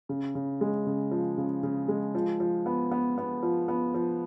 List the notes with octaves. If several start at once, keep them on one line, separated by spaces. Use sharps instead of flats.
C#3
C#3
G#3
C#3
F3
C#3
C#3
G#3
F3
F3
B3
B3
B3
F3
B3
F3